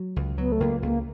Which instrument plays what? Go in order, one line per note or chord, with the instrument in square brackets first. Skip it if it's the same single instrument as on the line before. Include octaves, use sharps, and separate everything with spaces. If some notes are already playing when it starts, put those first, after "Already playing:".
Already playing: [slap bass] F#3
C#2
[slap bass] F#3 [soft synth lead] B3
[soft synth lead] A3
[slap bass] C#2 [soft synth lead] A#3
[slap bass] C#2 [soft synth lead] A#3